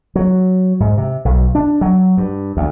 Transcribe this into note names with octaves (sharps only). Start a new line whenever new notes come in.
F#3
G#2
C3
B1
D4
F#3
G2
D2